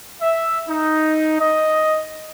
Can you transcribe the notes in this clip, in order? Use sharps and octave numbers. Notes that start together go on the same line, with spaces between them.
E5
D#4
D#5